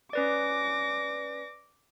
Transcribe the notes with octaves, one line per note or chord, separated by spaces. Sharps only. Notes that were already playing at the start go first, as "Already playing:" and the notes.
C#4 B4 D5 D6 A#6